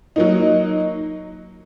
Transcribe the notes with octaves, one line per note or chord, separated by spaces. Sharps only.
F#3 A#3 D#4